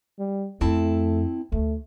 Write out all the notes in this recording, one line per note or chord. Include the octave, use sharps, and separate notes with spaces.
G3
F2 A3 C4 E4 A5
D2 A3